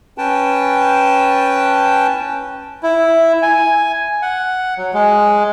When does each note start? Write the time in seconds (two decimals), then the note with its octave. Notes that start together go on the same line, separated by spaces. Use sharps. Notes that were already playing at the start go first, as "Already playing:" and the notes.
0.18 C#4 B4 G5 A5
2.83 E4
3.42 G#5
4.22 F#5
4.77 F#3
4.94 G#3